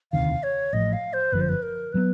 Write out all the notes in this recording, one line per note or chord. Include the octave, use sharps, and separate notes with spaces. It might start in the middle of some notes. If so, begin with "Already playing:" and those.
E1 D2 C3 D#3 F5
C#5
A1 A2 F3 D#5
F5
C5
G1 F#2 D3 F3 B4
C5
B4
A#4
D3 F#3 B3 B4